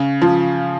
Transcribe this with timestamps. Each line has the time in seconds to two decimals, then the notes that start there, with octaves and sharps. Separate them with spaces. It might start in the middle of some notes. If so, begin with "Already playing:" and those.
Already playing: C#3
0.22 F3